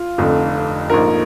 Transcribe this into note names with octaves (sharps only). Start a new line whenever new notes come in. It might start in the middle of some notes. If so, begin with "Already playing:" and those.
Already playing: F4
F1 F2 D3
A#1 G#2 F3 A#4